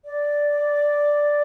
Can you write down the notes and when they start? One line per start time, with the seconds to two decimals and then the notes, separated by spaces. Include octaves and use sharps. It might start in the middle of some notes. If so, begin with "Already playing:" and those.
0.05 D5